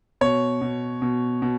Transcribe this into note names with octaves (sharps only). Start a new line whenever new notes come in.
B2 C#5
B2
B2
B2